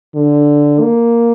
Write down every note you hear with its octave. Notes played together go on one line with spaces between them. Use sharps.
D3
A#3